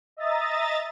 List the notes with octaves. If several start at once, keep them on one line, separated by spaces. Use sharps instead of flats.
D#5 E5 A#5 D#6 A6